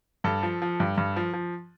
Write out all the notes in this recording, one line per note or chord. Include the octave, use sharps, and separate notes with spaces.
G2 A4
F3
F3
G2
G2
F3
F3